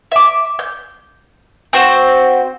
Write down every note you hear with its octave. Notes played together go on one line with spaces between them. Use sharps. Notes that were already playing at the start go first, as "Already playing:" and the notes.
E5 D6
G6
C4 F#4 C5